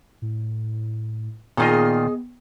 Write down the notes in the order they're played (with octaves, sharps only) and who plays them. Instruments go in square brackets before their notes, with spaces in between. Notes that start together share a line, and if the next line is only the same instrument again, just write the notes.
[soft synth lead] A2
[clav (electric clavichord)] A#2 D#3 F4 [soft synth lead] B3 [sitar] G#4 D5 D#5